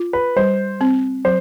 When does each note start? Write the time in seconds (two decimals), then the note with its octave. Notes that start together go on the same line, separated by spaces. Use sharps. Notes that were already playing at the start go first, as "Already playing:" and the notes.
Already playing: F4
0.13 B4
0.37 G3 C5
0.81 C4
1.25 F#3 C5